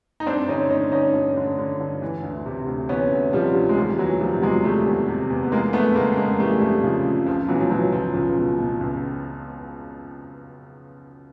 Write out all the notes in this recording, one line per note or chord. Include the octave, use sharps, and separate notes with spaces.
D#4
G2 C4 D4
D3 C#4 D#4
D3 C#4 D#4
G2 C#4 D#4
G2
D3
D3
G2
E3
D2
C3
D2
E3 B3 C#4
D2
C3 F3 G3
D2
G#3
D#3 F3 G3
E2 E3 F#3
C3 F3 G3
E2 F#3 G#3
D#3 G3 A3
E2
C3
E2
B3
E3 G#3 A#3
F2 A3 B3
C#3 G#3 A#3
F2 G#3 A#3
E3 G3 A3
F2 G3 A3
C#3 F3
F2
C#2 F3
B2 E3 F#3
F3
B2 E3 F#3
C#2 F3
C#2 F3
B2
B2
C#2